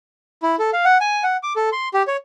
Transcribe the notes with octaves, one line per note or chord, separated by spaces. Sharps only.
E4
A4
F5
F#5
G#5
F#5
D6
A4
C6
G4
C#5